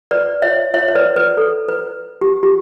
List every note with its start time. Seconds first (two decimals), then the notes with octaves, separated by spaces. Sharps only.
0.11 B4 D5
0.42 C#5 E5
0.74 C#5 E5
0.88 C#5
0.95 B4 D5
1.16 B4
1.37 A4
1.68 B4
2.21 G4
2.43 G4